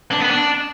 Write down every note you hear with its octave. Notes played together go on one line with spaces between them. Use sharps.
D4
B3
D4